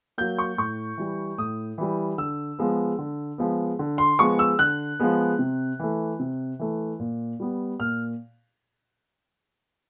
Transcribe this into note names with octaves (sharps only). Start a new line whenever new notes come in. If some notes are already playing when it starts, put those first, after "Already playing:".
F#3 A#3 G6
C#6
A2 C#6
E3 G3
A2 D#6
E3 G3
D3 E6
F3 G#3 B3
D3
F3 G#3 B3
D3
C6
F3 G#3 B3 C#6
E6
D3 F#6
F3 G#3 B3
C3
E3 A3
C3
E3 A3
A#2
G3 B3
A#2 F6